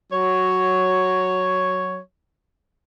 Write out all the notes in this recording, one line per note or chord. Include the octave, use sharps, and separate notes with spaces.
F#3 C#5